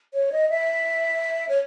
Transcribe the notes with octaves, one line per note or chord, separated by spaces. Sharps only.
C#5
D#5
E5
C#5